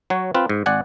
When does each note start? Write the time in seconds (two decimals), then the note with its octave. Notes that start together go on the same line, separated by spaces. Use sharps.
0.10 F#3 F#4 C#5
0.35 C4 F4 B4
0.49 G#2
0.66 G#1 D5 F#5 G#5